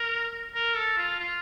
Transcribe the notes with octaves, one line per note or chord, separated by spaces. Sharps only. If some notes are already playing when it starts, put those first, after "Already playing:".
Already playing: A#4
A#4
A4
F4
F4